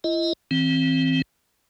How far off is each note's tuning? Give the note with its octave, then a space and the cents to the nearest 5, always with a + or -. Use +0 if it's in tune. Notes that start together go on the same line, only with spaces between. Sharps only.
E4 +40 D#5 +20
E3 -30 C4 +5